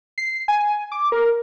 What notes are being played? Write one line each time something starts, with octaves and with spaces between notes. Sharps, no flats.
C7
G#5
D6
A#4